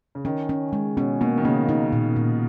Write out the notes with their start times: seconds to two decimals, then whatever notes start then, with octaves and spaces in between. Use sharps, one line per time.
0.15 C#3
0.25 D#3 C#4
0.49 C#4
0.73 G#3
0.97 B2 C#4
1.21 B2 A#3
1.38 D#3
1.45 C#3 A#3
1.69 D#4
1.93 A#2
2.16 A#2